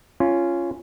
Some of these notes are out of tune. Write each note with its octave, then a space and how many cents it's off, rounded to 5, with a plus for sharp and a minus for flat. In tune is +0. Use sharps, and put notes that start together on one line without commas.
C#4 +0 F4 -15